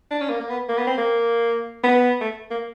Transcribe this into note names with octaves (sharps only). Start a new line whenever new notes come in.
D4
C#4
A#3
A#3
B3
A#3
B3
C4
A#3
B3
A3
A#3